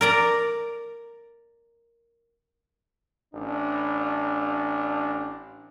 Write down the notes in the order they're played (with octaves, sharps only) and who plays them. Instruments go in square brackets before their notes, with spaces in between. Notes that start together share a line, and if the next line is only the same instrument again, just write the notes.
[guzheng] A#4 D5 A#5
[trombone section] A1 D4